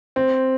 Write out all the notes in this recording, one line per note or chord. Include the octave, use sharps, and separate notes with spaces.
C4